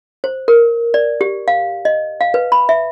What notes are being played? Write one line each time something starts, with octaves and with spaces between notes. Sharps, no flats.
C5
A#4
D5
G4
F5
D#5
F5
B4
B5
E5